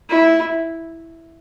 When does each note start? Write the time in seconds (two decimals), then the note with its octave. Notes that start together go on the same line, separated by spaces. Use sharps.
0.10 E4